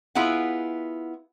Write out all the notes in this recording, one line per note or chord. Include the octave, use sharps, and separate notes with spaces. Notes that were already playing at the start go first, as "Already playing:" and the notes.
B3 E4 F4 G#4 F#5